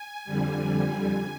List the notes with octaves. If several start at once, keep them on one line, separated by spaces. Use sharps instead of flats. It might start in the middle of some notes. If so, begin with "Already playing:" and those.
Already playing: G#5
F2 D3 G3